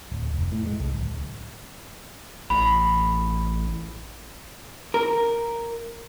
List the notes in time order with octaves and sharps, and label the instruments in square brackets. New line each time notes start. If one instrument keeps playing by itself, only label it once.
[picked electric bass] D1
F1
A2
G#3
C2
D1
[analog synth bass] A1 [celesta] B5
[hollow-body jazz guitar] A#4